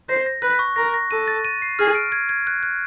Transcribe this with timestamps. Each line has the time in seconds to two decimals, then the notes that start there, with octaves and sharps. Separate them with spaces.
0.09 C5 A#6
0.26 A#6
0.42 B4 F#6
0.59 C#6
0.76 A#4 A#6
0.94 A#6
1.11 A4 D#7
1.28 A6
1.45 D#7
1.62 C7
1.79 G#4 F6
1.95 D7
2.12 G#6
2.29 G#6
2.47 F#6
2.63 F#6